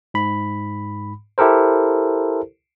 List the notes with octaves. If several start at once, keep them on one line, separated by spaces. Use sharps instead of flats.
G#2 B5
E4 G4 A4 A#4 C5